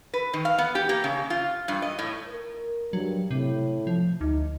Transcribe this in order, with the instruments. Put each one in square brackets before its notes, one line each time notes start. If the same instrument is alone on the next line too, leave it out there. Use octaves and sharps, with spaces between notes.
[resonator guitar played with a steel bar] B4
D#3
F5
B3
G4
A#3
C#3
F4
G2
D#5
A2
[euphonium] A#4
[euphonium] G2 [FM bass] F#3
[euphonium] A2 [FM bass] C3
[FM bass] F3
[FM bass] D2 [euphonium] D#4